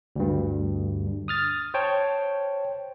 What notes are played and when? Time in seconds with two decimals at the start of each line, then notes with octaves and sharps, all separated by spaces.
0.16 D2 G2
1.28 D#6 F6 A6
1.74 C5 C#5 G5 A5